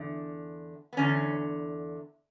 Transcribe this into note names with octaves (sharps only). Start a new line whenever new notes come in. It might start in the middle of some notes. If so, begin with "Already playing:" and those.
Already playing: E2 D3
B3
E2 D3 C#4